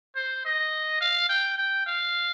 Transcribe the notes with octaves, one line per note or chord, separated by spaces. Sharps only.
C5
D#5
F5
G5
G5
F5